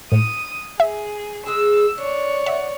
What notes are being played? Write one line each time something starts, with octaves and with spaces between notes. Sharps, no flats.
A2 D#6
G#4 E5
G#3 G#4 E6
D4 C#5 D5
E5 F#5